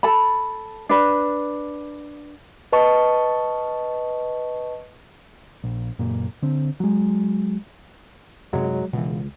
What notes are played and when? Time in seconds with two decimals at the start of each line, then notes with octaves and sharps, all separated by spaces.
0.03 A4 A5 B5
0.89 D4 B4
2.72 B4 D#5 A5 C#6
5.64 A#1
5.99 F#1 A#2
6.42 D3 C4
6.80 F#3 G#3
8.53 F#2 C3 F#3 G#3
8.93 C#2 B2 E3